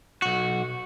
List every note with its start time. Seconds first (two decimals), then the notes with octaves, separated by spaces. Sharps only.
0.22 B1 F#4